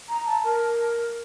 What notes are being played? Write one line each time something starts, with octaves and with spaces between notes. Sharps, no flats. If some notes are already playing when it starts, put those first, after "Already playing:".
A#5
A5
A#4